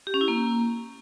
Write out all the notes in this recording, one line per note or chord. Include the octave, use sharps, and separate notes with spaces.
G4
C#4
E4
A#3